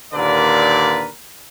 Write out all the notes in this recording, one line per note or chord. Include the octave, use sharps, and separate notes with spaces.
D#2 A#2 D3 A#4 B4 D5